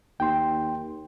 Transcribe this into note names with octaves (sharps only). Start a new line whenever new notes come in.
D#2 G5 C6